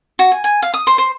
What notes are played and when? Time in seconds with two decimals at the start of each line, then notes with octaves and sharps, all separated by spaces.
0.19 F#4
0.32 G#5
0.44 G#5
0.62 F5
0.74 D#6
0.87 C5
0.98 C5